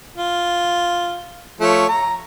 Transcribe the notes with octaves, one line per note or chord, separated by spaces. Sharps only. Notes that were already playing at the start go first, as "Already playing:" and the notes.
F4
F3 A3 C#5
A#5